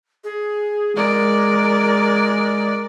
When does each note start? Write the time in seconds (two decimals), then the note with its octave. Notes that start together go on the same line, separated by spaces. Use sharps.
0.24 G#4
0.96 G#3 A#4 D5